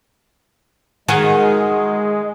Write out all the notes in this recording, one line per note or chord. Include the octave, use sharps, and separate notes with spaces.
D#3 G#3 F#4 G#4